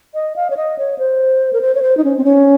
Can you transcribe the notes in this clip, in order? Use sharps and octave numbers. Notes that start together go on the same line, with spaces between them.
D#5
F5
C#5
D#5
C#5
C5
A#4
C5
C#5
C5
D#4
C#4
C4
C#4